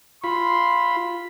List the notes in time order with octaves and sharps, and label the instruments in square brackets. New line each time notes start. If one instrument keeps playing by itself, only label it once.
[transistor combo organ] F4 B5 [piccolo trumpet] C6